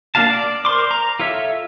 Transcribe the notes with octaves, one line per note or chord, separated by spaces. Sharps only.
A#3 D4 F#4 F5 A5
D5
A#4 C5 C6 D6
A#5
F4 A4 C#5 E5